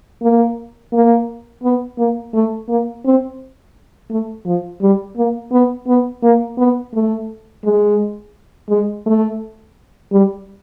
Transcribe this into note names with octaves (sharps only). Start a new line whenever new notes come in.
A#3
A#3
B3
A#3
A3
A#3
C4
A3
F3
G3
A#3
B3
B3
A#3
B3
A3
G#3
G#3
A3
G3